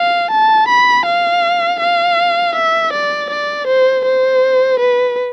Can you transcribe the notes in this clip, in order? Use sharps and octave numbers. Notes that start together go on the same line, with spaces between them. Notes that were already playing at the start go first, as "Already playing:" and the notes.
Already playing: F5
A5
B5
F5
F5
E5
D5
D5
C5
C5
B4